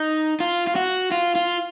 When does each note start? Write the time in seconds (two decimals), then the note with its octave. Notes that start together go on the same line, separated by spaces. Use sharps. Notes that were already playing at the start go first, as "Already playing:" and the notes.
Already playing: D#4
0.40 F4
0.67 F4
0.76 F#4
1.11 F4
1.35 F4